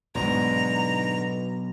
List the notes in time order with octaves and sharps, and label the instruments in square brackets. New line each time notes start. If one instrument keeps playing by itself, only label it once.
[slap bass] B1 [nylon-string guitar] G#2 D3 [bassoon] B2 [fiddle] A#5